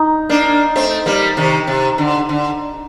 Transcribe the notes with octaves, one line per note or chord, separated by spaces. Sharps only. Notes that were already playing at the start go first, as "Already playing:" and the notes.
Already playing: D#4
A#3 D4
A3 C4
G3 A#3
C3 D#3
C3
D3
D3